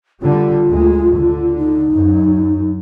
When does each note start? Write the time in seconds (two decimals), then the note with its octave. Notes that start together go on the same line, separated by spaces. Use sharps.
0.22 D3 G3 F4
0.69 D2 G#3
1.17 D3
1.57 D#4
1.93 F#2